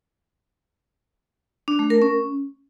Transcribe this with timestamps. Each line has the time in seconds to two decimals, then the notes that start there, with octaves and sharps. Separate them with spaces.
1.68 D4
1.79 A3
1.90 A#4
2.02 C#4